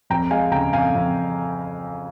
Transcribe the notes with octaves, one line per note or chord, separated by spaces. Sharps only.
F2 G5 A#5
G#3 F5 G#5
C#3 G5 A#5
F2 F5 G#5
F2